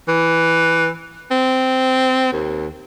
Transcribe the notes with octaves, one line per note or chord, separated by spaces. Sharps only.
E3
C4
D#2